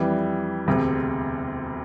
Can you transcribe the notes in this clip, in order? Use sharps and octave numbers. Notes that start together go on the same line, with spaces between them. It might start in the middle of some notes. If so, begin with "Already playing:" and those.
Already playing: F2 E3 G3
E1 D2 C3